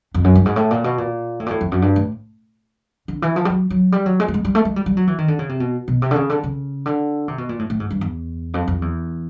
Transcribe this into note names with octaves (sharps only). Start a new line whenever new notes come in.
F2
F#2
G2
G#2
A2
A#2
B2
A#2
A2
A#2
A2
F2
F#2
G2
A2
D3
E3
F3
G3
F#3
F#3
G3
F#3
G#3
A3
G#3
G3
A3
G#3
G3
G3
F#3
E3
D#3
D3
C#3
C3
B2
B2
C3
D3
C#3
D3
C#3
D3
C3
B2
A#2
A2
A2
G#2
G2
E2
F2
F2
E2